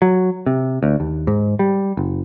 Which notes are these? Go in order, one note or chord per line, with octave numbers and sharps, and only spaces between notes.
F#3
C3
D2
D#2
G#2
G3
F#1